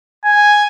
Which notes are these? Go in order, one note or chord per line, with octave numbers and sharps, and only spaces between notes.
G#5